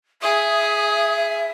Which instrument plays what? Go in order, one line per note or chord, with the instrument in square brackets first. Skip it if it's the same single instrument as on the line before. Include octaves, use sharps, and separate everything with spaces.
[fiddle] G#4 [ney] E5 [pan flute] D#6